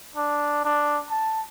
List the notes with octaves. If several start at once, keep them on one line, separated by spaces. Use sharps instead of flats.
D4
D4
A5